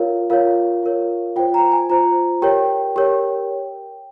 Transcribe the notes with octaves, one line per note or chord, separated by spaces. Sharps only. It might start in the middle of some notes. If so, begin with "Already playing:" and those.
Already playing: F4 A#4 C#5 F5
F4 A#4 C#5 F5
F4 A#4 C#5
F4 C5 G5
A#5
G#5
F4 C5 A#5
G4 A#4 C#5 G5
G4 A#4 C#5